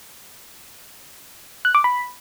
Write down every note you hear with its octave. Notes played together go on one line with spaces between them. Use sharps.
F#6
D6
B5